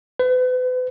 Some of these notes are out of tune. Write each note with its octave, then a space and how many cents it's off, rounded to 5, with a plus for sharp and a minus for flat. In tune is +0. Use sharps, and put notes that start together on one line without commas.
B4 +40